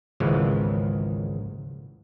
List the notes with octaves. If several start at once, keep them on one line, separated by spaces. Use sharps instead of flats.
G#1 C#2 C#3 E3 F3 G#3